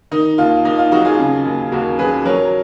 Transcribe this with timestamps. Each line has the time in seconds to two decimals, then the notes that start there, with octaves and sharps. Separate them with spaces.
0.11 D#3 D#4
0.38 D#2 F4
0.65 D#2 D#4
0.78 F4
0.92 F#3 D#4 F#4
1.05 F4 G#4
1.18 C#3
1.45 D#2
1.72 D#2 F#4 A#4
1.99 F#3 G#4 B4
2.25 F#3 A#4 C#5